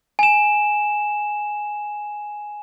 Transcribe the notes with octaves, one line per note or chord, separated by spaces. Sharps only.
G#5 E7